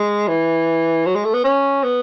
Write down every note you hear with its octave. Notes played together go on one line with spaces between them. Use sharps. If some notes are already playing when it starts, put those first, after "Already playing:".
Already playing: G#3
E3
F#3
G#3
A3
B3
C#4
B3